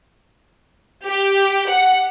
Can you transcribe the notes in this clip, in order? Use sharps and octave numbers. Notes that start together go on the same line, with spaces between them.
G4
F#5